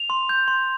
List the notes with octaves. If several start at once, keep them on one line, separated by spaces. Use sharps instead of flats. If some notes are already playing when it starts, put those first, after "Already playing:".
Already playing: F7
C6
G6
C6